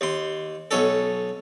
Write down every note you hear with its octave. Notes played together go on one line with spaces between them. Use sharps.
D#2 C6
B1 C#4 A4